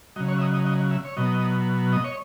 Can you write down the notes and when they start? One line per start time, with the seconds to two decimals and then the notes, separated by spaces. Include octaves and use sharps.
0.16 C#3 F#3 D#5
0.28 C#5
0.38 E5
0.41 D#5
0.54 D#5
0.66 D#5
0.91 E5
1.05 C#5
1.17 B2 F#3 D#5
1.93 D#5
2.04 C#5